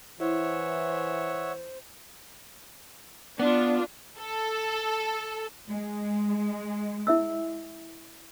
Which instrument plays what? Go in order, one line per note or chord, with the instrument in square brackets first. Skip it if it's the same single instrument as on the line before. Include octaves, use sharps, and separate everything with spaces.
[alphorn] E3 [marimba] E4 [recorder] C5 [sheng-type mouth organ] C#5 E5 F#5
[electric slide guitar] B3 [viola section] D4 F4
[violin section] A4
[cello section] G#3
[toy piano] E4 E5 E6